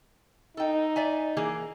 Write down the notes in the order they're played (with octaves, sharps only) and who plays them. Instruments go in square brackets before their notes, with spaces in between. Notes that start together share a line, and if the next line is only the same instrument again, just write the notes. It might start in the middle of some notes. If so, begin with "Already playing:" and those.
[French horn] D#4 [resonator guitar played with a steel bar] A4 G5
[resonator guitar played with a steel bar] D5 E5 G#5
E3 A#3 G#4